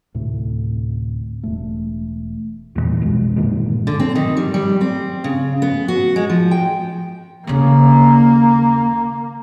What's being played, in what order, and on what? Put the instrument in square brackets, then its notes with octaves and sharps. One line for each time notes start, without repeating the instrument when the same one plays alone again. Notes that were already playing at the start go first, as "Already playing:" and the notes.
[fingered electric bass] D2 A2 C3
E1 A3
E2 G2 A#2 E3
A#1 F2 B2 G#3
G1 A#2 D#3 G#3
[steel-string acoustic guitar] D3
C4
D#3
G3
G3
C4
C#3
B3
F#4
G#3
F3
G5
[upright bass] D#2 C#3 [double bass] A#3